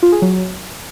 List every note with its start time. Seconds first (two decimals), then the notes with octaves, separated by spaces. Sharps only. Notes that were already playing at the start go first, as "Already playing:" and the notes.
0.03 F4
0.12 G#4
0.22 F#3